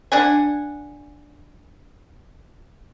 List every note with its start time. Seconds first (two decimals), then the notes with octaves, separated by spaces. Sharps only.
0.12 D4 F#5 G#5